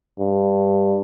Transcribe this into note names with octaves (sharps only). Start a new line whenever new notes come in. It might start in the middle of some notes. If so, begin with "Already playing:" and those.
G2